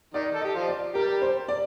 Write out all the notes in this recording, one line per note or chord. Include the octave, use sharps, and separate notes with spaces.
D#3 D#4 D5
A4
D#5
G4
F3 F4
D5
G3 G4 A#4
C5
D5